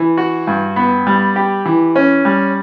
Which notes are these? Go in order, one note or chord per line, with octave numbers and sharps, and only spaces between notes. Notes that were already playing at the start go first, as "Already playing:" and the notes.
Already playing: E3
F#4
G2
B3
G3
G4
E3
C#4
G3